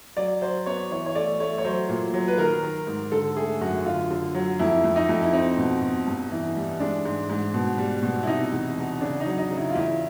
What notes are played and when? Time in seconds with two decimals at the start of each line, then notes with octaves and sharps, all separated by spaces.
0.17 F#3 D5
0.42 F#3 C5
0.66 B3 C#5
0.91 E3 C#5
1.06 C#5
1.15 A3 D5
1.40 A3 C#5
1.58 C#5
1.65 F#3 C5
1.89 A#2
2.14 F#3
2.28 B4
2.38 D#3 A#4
2.63 D#3
2.87 G#2
3.12 D3 A4
3.37 A3 G#4
3.61 F#2 F#4
3.85 D3 F4
4.11 D3
4.35 F#3
4.59 F2 E4
4.84 F2
4.96 D#4
5.09 F2
5.23 E4
5.33 C4 D#4
5.58 B2
5.82 B2
6.06 G2
6.31 E3
6.56 G3
6.80 G#3 D4
7.05 G#2
7.29 G#2
7.54 B2
7.78 G3
8.03 B2
8.23 E4
8.27 C3 D#4
8.52 E2
8.77 E2
9.01 C#3 D4
9.20 D#4
9.26 F#3
9.38 D#4
9.50 C#3
9.57 E4
9.70 F4
9.75 E2 E4